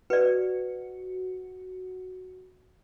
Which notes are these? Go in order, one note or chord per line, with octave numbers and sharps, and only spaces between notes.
F#4 B4 D5